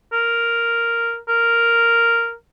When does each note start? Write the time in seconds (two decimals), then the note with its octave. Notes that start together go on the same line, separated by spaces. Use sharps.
0.13 A#4
1.29 A#4